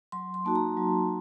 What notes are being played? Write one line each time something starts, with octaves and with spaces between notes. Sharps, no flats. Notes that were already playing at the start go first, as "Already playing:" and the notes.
F#3 C6
C6
A#3 D#4 F#4 A5
A#5
F#3